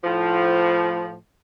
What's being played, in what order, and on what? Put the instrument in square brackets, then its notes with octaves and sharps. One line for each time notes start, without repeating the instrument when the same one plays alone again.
[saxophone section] A2 F3